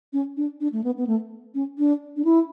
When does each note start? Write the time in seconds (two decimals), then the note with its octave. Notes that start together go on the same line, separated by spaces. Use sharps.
0.13 C#4
0.37 D4
0.61 D4
0.72 A3
0.84 B3
0.97 B3
1.07 A3
1.55 C#4
1.78 D4
2.17 D4
2.25 E4